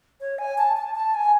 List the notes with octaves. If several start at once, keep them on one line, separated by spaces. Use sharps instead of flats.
C#5
G#5
A5
A5
A5
G#5